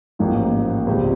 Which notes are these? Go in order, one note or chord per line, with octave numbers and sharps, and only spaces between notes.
A1 G#2 F3 A#3 D#4
C#2 B2 G3 C4